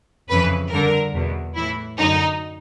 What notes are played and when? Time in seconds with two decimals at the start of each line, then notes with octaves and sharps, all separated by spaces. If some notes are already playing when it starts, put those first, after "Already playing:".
0.29 F2 C#3 E3 B4
0.71 G2 D3 A#4
1.13 E2 B2
1.55 A2 E3 E4
1.98 F#2 D3 D#4